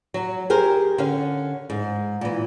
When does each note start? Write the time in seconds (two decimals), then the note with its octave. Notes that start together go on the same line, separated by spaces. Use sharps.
0.14 F#3
0.50 G4 G#4 A#4 C5
0.98 D3 C#4 F5
1.70 G#2
2.21 A#2 E3